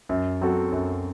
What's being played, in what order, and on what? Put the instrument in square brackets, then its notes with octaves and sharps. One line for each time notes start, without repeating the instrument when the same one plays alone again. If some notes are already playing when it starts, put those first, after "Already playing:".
[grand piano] F#2
F#3 C4 F#4 A4
F#2